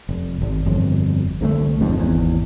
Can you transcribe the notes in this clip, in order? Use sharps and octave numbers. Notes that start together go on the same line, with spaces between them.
F1
G#1
G1 F2
C2 D3 G3 A3
G1 F2 G#2
G#1 E2